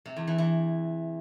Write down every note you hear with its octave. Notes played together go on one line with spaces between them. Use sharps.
C3
E2
E3
E3